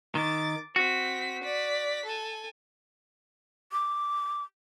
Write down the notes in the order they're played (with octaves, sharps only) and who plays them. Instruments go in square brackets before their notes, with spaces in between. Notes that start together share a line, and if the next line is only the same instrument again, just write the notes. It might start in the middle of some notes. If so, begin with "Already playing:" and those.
[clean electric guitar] D#3 [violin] D6 A6
[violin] C4 B6 [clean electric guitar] F#4
[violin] D5 B6
A4 G#5
[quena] D6